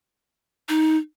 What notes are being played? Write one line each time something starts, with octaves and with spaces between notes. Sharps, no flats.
D#4